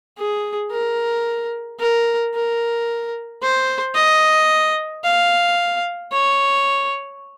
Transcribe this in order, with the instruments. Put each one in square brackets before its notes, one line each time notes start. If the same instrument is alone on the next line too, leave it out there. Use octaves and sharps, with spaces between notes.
[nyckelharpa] G#4
A#4
A#4
A#4
C5
D#5
F5
C#5